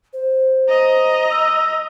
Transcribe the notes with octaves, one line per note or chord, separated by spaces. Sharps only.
C5
D#5 A#5
E6